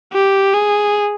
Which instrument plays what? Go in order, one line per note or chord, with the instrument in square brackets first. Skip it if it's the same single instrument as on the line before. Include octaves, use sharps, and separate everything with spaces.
[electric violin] G4
G#4